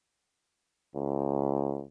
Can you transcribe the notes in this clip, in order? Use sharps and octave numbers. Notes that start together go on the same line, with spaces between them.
C#2